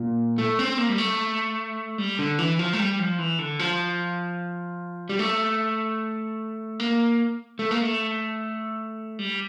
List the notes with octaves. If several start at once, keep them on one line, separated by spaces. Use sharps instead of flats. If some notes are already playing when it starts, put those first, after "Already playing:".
Already playing: A#2
A3
C4
A#3
G3
A3
G3
D3
E3
F3
A3
G3
F3
E3
D3
F3
G3
A3
A#3
A3
A#3
A3
G3